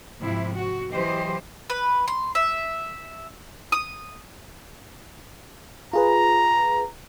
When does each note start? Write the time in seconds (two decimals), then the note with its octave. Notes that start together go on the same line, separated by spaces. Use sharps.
0.20 G#2 C3 F3 E4
0.54 F#4
0.91 E3 F#3 G4 C5 D#5
1.70 B4
2.08 C6
2.35 E5
3.72 D#6
5.93 F4 G#4 B4 A#5